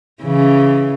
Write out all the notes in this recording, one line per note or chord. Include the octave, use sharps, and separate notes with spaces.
C#3 E3